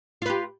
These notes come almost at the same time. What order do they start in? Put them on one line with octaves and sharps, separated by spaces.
F4 B4 G4